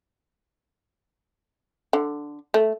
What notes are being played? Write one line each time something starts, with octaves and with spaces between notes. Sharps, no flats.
D3
A3